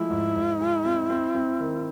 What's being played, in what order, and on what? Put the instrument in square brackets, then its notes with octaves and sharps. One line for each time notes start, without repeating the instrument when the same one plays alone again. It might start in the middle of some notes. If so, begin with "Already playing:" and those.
Already playing: [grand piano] F3 G#3 A3 [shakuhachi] E4
[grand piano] G#2
G#2
G#3
C4
C4
C4
D#3